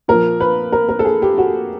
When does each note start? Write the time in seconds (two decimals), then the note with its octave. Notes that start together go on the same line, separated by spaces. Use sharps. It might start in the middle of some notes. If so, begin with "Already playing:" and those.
0.08 A#2 F3 A#4
0.40 B4
0.72 A#4
0.89 A#4
0.99 A4
1.05 G#4
1.22 G4
1.38 F#4